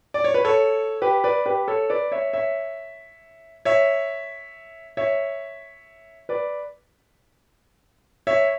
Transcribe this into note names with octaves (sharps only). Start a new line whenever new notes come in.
D5
C#5
B4
A4 C#5
G4 B4
B4 D5
G4 B4
A4 C#5
B4 D5
C#5 E5
C#5 E5
C#5 E5
C#5 E5
B4 D5
C#5 E5